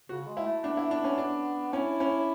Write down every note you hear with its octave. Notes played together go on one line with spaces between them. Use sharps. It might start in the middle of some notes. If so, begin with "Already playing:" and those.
C#3 F#4
G#3
E4
A3
B3 D4
E4
D4
C#4
D4
C#4 E4
C#4